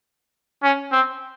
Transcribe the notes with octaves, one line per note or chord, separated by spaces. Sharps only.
C#4
C4